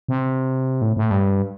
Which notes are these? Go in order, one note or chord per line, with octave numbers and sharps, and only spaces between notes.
C3
A2
A2
G2